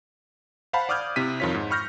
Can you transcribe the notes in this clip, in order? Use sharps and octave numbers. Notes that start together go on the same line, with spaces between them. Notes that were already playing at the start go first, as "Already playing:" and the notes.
C5 F5 F#5 A5 B5
D5 D6 D#6 F6 G6 G#6
C3 C4 E4 B6 D#7
F2 D#3 F4 C#5 B6
G#2
B5 C#6 F6 G6 A#6